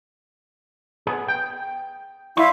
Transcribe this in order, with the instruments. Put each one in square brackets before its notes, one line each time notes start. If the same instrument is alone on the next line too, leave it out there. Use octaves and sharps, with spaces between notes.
[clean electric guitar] B3 G#4
G5
[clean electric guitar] G3 C6 [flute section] E4 F5